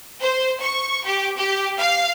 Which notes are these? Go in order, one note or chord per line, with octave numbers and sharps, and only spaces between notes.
C5
C#6
G4
G4
F5